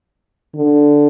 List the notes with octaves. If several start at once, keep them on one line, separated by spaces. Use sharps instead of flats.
D3